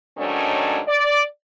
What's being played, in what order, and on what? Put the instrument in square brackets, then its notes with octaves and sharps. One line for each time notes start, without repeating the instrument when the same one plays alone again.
[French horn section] G#2 D#3 F#3 A3 C#4 D4
D5